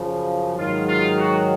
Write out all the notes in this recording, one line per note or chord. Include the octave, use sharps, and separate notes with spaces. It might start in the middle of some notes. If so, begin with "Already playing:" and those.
Already playing: F#2 C#3 F3
G#2 D#3 F#3 F4
F4
F#4